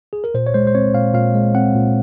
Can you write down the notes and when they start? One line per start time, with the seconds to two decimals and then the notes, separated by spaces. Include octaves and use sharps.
0.13 G#4
0.24 A#4
0.34 A#2 C5
0.47 C#5
0.54 G#3 C5
0.67 C5
0.75 C4 C#5
0.94 A#2 F5
1.14 A#2 F5
1.34 G#3
1.55 C4 F#5
1.75 A#2